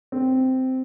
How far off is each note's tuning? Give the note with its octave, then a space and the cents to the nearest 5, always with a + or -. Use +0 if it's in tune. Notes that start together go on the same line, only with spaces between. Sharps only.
C4 -10